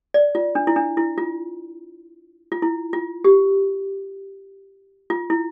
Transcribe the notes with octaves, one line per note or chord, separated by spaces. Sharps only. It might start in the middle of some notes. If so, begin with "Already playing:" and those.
D5
F4
D4
E4
D4
E4
F4
F4
E4
F4
G4
F4
E4